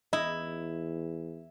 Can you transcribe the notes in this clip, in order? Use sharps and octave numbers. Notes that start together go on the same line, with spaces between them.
E2 E4 D#5